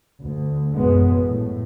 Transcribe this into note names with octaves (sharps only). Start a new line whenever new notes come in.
D2
A1 F#2 B2 G#3 B3
A2